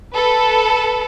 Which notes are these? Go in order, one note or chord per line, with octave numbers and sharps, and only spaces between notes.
A4 B4